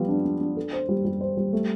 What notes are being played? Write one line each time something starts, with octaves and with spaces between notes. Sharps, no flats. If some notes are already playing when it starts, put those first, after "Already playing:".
Already playing: F3 G3 B3 F4
D4
D4
D4
A4
C5
G3
G3
C5
G3
A3